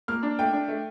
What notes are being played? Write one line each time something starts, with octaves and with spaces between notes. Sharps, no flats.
A#3 F6
D4
A3 G5
D4
A3